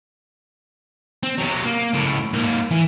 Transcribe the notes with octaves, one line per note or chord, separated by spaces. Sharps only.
C4
C3 F#3
A#3
C#2 A2
G#2 A#3
E3